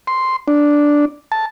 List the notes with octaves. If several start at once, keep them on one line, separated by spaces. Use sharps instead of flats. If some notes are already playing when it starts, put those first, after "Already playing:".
C6
D4
A5